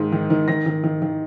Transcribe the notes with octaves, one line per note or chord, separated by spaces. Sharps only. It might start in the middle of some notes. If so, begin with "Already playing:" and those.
Already playing: G#2 D#3
D#3
D#3
D#3 A#6
D#3
D#3
D#3